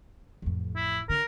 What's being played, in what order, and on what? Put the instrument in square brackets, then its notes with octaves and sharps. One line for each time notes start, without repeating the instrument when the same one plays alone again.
[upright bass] A1 F2
[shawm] E4
[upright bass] D3 [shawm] A#4